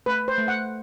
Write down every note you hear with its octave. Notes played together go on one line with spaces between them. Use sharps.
A3 B4
C5
A3
F#5